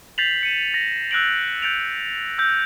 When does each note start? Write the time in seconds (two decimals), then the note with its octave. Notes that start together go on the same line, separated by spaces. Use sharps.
0.18 G6 A6 B6 C7 F7 F#7
0.43 C#7 D#7 E7
0.74 A#6
1.11 E6 F#6 G6 A#6 D7 F#7
1.62 F#6 G6 A6 C#7 D7 F7
2.38 E6 G6 A#6